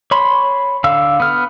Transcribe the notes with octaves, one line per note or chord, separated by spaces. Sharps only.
C#5 B5 C6
D3 F5 E6
B3 F6